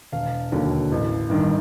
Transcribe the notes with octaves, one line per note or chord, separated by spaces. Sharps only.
E1 F5
D#2 D3 F#3
A1
G2 D#3